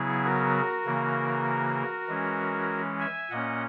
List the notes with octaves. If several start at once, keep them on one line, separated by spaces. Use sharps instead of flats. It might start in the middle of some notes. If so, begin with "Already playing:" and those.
Already playing: C#3 F#3 B3 E4 G#4
F#4 A#4
C#3 E3 A#3
E3 G#3 C#4
E5 G#5
A#2 A#3 C#4 D#5 F#5